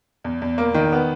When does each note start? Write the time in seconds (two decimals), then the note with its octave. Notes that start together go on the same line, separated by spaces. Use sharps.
0.24 E2
0.42 E2
0.58 A#3
0.74 D#3
0.92 B3